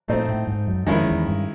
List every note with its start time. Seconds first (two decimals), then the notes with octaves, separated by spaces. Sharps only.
0.08 A#2 A3 C4 D#4
0.29 A2
0.47 G#2
0.67 F#2
0.87 F2 D#3 G#3 C#4 E4
1.06 E2
1.26 G2